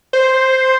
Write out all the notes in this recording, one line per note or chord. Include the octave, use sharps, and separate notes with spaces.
C5